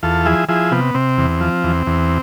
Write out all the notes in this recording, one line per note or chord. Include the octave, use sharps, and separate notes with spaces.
E2 F4 A4
F3 E4 G#4
F3 E4 G#4
C3 B3
C3 C4
E2
F3
E2
E2